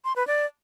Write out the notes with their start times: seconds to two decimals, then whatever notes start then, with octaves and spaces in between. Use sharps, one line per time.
0.05 C6
0.16 B4
0.27 D5